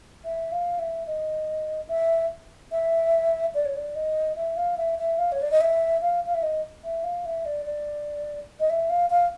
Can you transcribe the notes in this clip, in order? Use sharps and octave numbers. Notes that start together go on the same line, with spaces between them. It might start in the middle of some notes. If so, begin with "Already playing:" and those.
E5
F5
E5
D#5
E5
E5
D5
C#5
D5
D#5
E5
F5
E5
E5
F5
C#5
D5
D#5
E5
F5
F5
E5
D#5
E5
F5
E5
D5
D5
D#5
E5
F5
F5